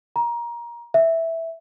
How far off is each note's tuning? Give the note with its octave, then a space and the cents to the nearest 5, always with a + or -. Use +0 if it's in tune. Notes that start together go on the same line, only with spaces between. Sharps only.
A#5 +20
E5 -5